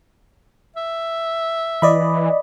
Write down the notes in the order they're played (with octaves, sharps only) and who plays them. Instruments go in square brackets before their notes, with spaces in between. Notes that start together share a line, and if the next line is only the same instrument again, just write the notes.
[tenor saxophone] E5
[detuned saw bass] E3 [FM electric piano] D5 D#5 B5